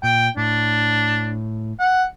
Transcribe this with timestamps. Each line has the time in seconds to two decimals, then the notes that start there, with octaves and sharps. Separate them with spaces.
0.03 A#2 G5
0.37 A2 D4
1.79 F#5